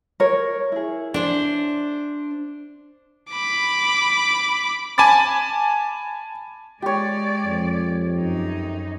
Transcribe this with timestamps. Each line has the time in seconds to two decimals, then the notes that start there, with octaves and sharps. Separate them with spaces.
0.20 A#4 C#5
0.72 E4 G#4
1.14 D4 C5
3.31 B5 D6
4.98 G#5 A5 B5 D6 A6
6.82 G#3 G4 C#5 D5
7.45 F2
8.18 F#2 D#4